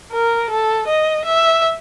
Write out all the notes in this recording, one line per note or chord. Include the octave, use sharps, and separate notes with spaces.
A#4
A4
D#5
E5